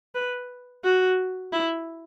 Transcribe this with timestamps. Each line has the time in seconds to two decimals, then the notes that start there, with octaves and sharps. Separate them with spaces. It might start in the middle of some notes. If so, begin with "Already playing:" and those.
0.15 B4
0.84 F#4
1.53 E4